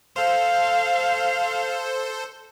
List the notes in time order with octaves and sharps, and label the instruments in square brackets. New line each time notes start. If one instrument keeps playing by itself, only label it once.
[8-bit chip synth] A4 C5 [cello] F5